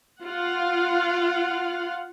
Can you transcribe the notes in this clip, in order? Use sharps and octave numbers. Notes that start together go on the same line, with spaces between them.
F4 F5 F#5